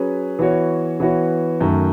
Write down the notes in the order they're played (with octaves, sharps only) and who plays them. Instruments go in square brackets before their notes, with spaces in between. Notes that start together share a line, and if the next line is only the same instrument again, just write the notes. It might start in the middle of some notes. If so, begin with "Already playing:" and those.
Already playing: [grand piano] F#3 C#4 G#4 B4
E3 B3 F#4 C#5
E3 B3 F#4 C#5
F#2 D#3 A3